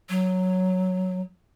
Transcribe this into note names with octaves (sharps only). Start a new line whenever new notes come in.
F#3